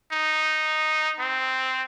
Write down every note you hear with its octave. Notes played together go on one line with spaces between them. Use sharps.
D#4
C4